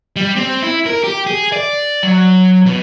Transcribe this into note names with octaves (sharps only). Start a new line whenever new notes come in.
G3
C4
E4
A#4
G4
G#4
D5
F#3
B2